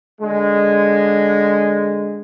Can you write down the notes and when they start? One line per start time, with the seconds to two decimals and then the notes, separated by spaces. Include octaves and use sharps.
0.20 D3 G#3